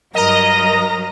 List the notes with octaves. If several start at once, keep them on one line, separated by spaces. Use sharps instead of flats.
G2 F#3 A#4 D#5 A#5